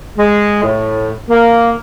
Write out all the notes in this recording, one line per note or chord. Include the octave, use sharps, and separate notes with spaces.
G#3
A2
A#3